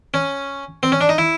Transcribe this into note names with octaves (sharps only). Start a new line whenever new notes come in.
C#4
C4
C#4
D4
D#4
E4